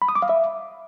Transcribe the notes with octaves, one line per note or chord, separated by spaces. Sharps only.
B5
D#6
D6
F5
E5